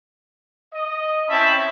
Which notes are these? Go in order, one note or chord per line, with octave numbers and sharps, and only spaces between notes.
D#5
C4 C#4 E4 E5 A5 B5